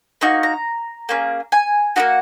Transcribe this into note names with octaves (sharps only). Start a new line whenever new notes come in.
A#3 D#4 F#4 C#6
A#5
A#3 C#4 G#4
G#5
A#3 D#4 F#4 F#5